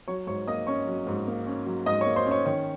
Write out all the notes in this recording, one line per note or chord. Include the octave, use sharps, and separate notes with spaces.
F#3 C#5 C#6
G#2 C#5 C#6
A#3 D#5 D#6
C#4 C#5 C#6
F#3
G#2
A#3
C#4
F#3
G#2 D#5 D#6
C#5 C#6
A#3
C5 C6
C#4
C#5
D#3 C#5